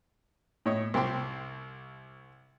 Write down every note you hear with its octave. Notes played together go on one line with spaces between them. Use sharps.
A2 C#5 D#5
C2 C4 G5 C6 D6